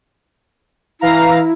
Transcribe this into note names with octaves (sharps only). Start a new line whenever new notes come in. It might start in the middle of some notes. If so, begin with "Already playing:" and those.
E3 E4 F5 A#5